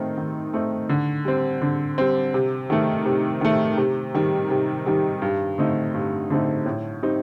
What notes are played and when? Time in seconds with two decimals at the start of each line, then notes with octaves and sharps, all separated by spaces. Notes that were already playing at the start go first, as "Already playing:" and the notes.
Already playing: D#3 A3 C4 D#4
0.17 D#3
0.54 A3 C4 D#4
0.89 D3
1.25 G3 C4
1.62 D3
1.98 G3 C4
2.34 C3
2.70 D#3 A3
3.06 C3
3.41 D#3 A3
3.77 C3
4.14 D#3 G3
4.50 C3
4.86 D#3 G3
5.22 G2
5.58 D3 A3 C4 D#4
5.94 G2
6.30 D3 A3 C4 D#4
6.66 A2
7.02 G3 C4 D#4